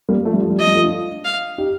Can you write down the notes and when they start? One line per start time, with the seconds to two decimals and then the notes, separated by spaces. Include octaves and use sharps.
0.09 G3 A#3
0.25 F3 A3
0.34 G3
0.41 F3
0.50 G3
0.58 F3 D#5
0.67 G3
0.75 F3 A3
0.83 D4 F4
1.25 F5
1.58 D#4 G4